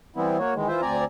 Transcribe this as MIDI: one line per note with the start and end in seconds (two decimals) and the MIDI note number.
0.16 0.38 52
0.16 0.38 55
0.16 0.38 59
0.16 0.38 60
0.16 0.38 64
0.39 0.54 58
0.39 0.54 66
0.39 0.54 73
0.54 0.68 51
0.54 0.68 52
0.54 0.68 56
0.68 0.81 52
0.68 0.81 65
0.68 0.81 72
0.68 0.81 76
0.82 1.04 38
0.82 1.04 60
0.82 1.04 74
0.82 1.04 80
0.82 1.04 82